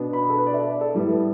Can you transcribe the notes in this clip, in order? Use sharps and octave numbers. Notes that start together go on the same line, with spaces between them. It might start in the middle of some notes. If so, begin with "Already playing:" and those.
Already playing: B2 B3 D4
B5
A4
B4
D5
E5
D5
A4
A2 G3 B3 E4